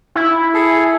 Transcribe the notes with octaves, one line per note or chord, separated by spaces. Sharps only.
E4
G#4 A4